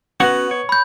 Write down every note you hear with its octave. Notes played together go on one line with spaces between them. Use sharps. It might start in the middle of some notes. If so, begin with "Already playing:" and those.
B3 C#4 F#4 F#5
C#5
B5 G6